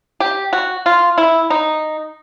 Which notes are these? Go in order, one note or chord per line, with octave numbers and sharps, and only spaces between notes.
G4
F#4
F4
E4
D#4